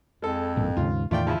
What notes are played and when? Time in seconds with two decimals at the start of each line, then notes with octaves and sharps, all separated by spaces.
0.22 F2 G#3 A4
0.57 A1 G2 A#2
0.77 D#2 G#2 C#3 F4
1.11 E2 A2 D#3 A3 F4 D5 G5
1.27 C#3 F3 E4